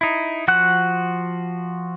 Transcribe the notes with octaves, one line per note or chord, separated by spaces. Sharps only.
D#4 E4
F3 F#4 F#5 F#6